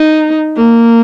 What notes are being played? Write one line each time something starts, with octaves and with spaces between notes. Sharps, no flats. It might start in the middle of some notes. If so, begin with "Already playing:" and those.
Already playing: D#4
A#3